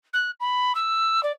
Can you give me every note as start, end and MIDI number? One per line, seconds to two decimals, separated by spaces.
0.13 0.31 90
0.40 0.72 83
0.75 1.23 88
1.23 1.32 74